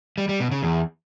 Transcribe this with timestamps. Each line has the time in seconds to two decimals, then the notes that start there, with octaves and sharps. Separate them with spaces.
0.18 G3
0.29 G3
0.40 B2
0.51 C#3
0.63 E2